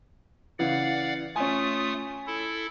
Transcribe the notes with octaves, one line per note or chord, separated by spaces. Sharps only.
C#3 E3 D5 F5 F#5
A3 C#4 F4 G#5 D#6
E4 A4